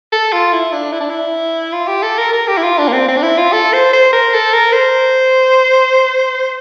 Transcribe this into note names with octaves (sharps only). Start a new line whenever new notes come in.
A4
F4
E4
D4
E4
D4
E4
F4
G4
A4
A#4
A#4
G4
E4
F4
D4
A#3
C4
C4
D4
E4
F4
A4
C5
C5
A#4
A4
A#4
C5